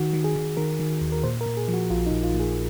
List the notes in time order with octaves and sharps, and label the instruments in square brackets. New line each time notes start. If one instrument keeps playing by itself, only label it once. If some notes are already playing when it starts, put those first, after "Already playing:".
Already playing: [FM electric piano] D#3 F#4
D#3
G#4
D#3
D#3 A#4
D#3
D#2
A#4
A#2 C5
A#4
A#2
G#4
F3
F#4
A#1 F4
D#4
A#1
F4
A#2
G#4